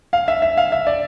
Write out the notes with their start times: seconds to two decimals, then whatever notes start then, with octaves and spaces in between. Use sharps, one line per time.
0.13 F5
0.28 E5
0.42 E5
0.57 F5
0.72 E5
0.87 D5